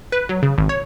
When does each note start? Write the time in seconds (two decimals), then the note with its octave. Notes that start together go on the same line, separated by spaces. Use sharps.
0.12 B4
0.29 F#3
0.43 C#3
0.58 G#1
0.69 C#5